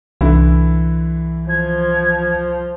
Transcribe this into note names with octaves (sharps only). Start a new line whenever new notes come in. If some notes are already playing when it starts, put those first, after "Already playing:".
C2 D3 E3 E4
F3 G#6